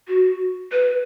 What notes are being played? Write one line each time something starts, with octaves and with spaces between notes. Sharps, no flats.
F#4
B4